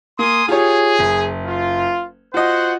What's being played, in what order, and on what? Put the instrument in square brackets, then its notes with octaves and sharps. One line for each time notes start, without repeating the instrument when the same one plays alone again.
[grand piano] A#3 [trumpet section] G#5 C6 D#6
[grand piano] F4 G4 C#5 [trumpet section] G#4
[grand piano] F#1
[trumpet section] F4
[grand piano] F4 D#5 [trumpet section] F#4 C5 F#5